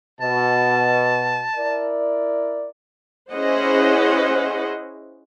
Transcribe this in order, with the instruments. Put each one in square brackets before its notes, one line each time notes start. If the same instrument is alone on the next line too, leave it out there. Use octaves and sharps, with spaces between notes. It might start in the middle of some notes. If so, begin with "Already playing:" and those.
[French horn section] B2 [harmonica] A5
[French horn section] E4 A#4 D5
[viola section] C#4 E4 G#4 C5 D#5 F#5